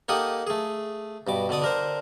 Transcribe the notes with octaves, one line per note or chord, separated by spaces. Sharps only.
A#3 D#4 G4 A4 F#5 D#6
A3 G#4
G2 B2 D6
B2 D3 D5 D#6
D3 A#4 C5